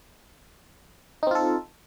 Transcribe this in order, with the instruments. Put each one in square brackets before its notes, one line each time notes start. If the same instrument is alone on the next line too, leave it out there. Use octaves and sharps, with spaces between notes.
[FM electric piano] D#4
C4
F4
A4